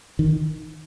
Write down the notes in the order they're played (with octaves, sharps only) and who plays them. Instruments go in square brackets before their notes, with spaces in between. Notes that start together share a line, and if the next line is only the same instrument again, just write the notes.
[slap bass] D#3